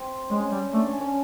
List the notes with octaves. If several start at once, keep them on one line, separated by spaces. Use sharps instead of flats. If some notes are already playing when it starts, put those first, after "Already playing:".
Already playing: C4
G#3 C#4
G3
A3 D4
C#4
C#4